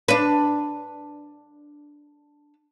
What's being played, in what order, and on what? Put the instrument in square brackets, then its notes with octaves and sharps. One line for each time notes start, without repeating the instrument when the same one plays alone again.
[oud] D4 B4